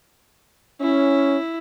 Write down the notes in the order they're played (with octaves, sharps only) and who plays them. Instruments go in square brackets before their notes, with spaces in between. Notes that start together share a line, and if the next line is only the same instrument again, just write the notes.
[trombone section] C#4 [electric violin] E4